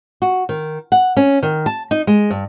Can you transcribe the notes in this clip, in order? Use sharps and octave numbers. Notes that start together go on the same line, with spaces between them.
F#4
D#3
F#5
C#4
D#3
A5
D#4
G#3
G2